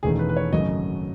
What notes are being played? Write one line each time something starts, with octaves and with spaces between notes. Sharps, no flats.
E1 E2 D#3 A3 C#4 G#4
B4
B4
C#5
G#1 F#2 C#3 F#3 A3 D#5